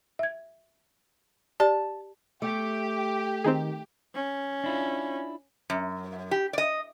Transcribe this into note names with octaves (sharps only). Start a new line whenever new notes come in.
E5 G#6
G4 D5 A5
A3 G4 D6
D#3 C4 D#4 G#4
C#4
D4 E4 F4
F#2
G4
D5 D#5